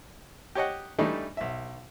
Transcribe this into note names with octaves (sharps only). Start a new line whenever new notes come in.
G4 C#5 D#5 F#5
E3 G3 A3 D4 D#4
B1 E5